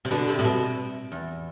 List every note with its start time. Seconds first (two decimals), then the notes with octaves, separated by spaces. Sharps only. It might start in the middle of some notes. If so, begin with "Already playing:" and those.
0.05 C3
0.11 B2 D3
0.28 C3
0.39 A2
0.44 B2
1.12 E2